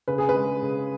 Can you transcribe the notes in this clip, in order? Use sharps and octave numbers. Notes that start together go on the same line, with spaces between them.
C#3 B4
G#4
B4
G#3
C#3